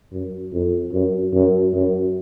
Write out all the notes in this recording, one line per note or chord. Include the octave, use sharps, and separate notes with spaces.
F#2
F2
F#2
F#2
F#2